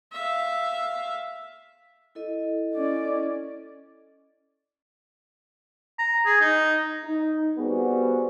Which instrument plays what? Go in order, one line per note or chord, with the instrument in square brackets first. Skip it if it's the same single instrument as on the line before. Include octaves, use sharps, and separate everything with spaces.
[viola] E5 F5
[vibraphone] E4 A4 D#5
[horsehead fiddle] C#4 D5
[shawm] A#5
G#4
D#4
[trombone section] D#4
G3 B3 C4 F#4 G#4